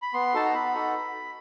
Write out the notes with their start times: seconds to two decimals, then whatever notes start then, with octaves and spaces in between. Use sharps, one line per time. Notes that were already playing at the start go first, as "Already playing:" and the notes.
0.02 B5
0.13 B3 C6
0.34 D#4 F#4 A4 A5
0.45 A#5
0.54 B3 B5
0.74 D#4 F#4 A4